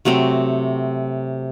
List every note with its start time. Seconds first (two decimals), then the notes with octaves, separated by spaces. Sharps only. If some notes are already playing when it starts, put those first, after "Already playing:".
0.05 C3 F#3 A3 C4